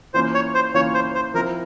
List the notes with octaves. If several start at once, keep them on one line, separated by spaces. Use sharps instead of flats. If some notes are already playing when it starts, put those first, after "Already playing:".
E3 A#3 C#4 F4 C5
C#5
C5
E3 A#3 C#4 F4 C#5
C5
C5
F3 C4 E4 A#4